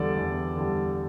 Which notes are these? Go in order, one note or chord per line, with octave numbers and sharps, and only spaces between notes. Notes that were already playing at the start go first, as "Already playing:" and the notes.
Already playing: E2 D3 G3 A4 D5
E2
D3 G3